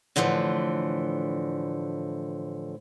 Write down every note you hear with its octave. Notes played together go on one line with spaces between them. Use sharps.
A2 D3 E3 F3 A3